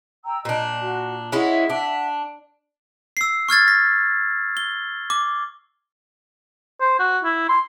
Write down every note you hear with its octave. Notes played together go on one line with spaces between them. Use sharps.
G5 A#5 E6
A#2 D4 D#5
F#4
G#3 C#4 E4 E5 F#5
D4
E6 C7
C#6 F6 G#6 A6
A#6
G7
D6
C5
F#4
E4
C6